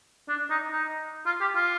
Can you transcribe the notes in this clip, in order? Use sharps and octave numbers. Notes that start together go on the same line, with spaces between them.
D4
D#4
D#4
F4
G4
F4